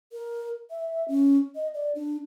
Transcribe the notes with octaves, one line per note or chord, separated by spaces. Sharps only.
A#4
E5
C#4
D#5
D5
D4